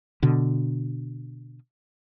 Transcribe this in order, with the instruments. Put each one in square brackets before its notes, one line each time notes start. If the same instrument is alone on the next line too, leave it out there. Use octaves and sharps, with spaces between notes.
[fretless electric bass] B2 D3